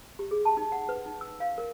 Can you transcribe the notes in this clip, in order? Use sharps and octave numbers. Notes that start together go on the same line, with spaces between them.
G4
G#4
A5
D#4
F#5
B4
D#4
E6
F5
A#4